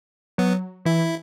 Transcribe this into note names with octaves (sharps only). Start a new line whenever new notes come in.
F#3 B3
E3 E4